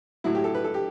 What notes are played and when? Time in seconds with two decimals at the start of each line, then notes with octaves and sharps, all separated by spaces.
0.24 A2 F#3 E4
0.35 G4
0.44 A4
0.55 B4
0.64 A4
0.74 G4